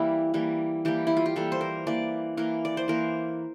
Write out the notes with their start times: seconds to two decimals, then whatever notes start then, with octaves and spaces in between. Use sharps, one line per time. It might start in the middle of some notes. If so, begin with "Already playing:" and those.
Already playing: E3 G3 A#3 E4
0.34 E3 G3 A#3
0.85 E3 G3 A#3 G4
1.07 E4
1.17 F4
1.26 G4
1.36 E3 G3 A#3 A4
1.52 C5
1.61 A#4
1.87 E3 A#3 D5
2.37 E3 A#3 A#4
2.65 D5
2.77 C5
2.88 E3 A#3 A#4